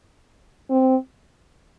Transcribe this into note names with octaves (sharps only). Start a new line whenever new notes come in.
C4